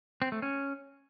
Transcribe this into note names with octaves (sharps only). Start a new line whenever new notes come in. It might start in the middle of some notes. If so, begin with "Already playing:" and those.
C4
A3
C#4